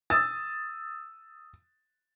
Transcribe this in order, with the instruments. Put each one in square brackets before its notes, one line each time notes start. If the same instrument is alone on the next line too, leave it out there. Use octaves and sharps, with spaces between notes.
[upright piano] D#6 E6 A6